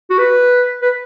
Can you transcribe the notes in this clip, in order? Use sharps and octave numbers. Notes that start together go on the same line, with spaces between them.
F#4
B4
B4